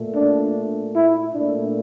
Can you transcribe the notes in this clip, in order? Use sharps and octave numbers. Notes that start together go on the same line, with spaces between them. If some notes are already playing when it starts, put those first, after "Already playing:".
Already playing: A#2 A3
D4
E4
A#2 A3 D4